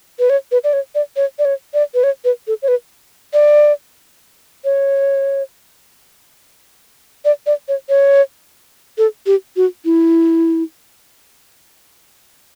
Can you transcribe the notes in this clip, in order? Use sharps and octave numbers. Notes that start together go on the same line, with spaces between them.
B4
C#5
B4
D5
C#5
D5
C#5
D5
C#5
D5
B4
C#5
B4
A4
C#5
B4
D5
C#5
D5
D5
C#5
C#5
A4
G4
F#4
E4